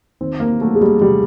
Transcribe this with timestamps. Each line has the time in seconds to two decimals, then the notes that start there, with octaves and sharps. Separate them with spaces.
0.21 D#3 C4
0.40 A#3
0.60 F#3 A3
0.75 G#3
0.81 G3
1.02 C3 G3